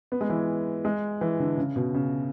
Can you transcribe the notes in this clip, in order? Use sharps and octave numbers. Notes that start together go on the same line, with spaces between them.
B3
G#3
E3
G#3
E3
D3
C#3
B2
C#3